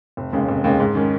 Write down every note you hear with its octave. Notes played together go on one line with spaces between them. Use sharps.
F1
D#2 C#3 G#3
F1
D#2 C#3 G#3
G#2
D#3 G#3 C#4